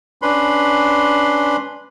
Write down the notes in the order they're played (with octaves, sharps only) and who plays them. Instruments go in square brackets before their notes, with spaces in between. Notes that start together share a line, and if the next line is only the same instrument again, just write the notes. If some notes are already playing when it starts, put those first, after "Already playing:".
[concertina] C#4 D4 B4 B5 C6